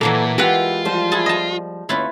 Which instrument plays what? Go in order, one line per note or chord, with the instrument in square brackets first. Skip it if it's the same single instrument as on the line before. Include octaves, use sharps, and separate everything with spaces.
[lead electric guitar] A#2 [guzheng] E3 F#3 A#3 [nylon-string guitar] A4
[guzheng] G#3 E5 F#5 [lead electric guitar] F4 [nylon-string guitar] G4 B4
[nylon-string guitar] F3 G3 C5
[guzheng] E4 G#4 A5
D#5 A5
[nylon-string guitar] D#2 C#4 [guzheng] E4 F4 B4